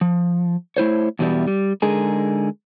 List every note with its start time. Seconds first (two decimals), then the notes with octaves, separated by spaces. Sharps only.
0.01 F3
0.77 A3 E4 C5 C#5
1.19 E2 B2 E3 G3 E4
1.47 G3
1.82 D3 G#3 D#4 G#4 A#4